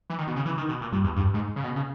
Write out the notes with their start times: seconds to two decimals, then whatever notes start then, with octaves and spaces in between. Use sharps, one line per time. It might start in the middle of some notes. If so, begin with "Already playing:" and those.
0.10 E3
0.18 D#3
0.27 B2
0.36 C#3
0.46 E3
0.57 D#3
0.69 B2
0.81 A#2
0.92 G2
1.04 E2
1.16 G2
1.34 G#2
1.56 C#3
1.64 B2
1.76 C#3